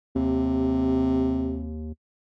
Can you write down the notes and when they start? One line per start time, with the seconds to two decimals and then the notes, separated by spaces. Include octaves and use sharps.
0.15 D#2 C3